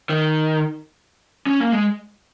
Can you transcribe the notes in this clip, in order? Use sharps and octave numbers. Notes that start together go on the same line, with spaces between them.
D#3
C#4
A#3
G#3